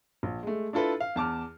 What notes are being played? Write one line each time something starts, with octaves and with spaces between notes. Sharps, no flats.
A#1
G#3 A3
D4 E4 F4 A4 B4
F5
E2 A5 D6 F6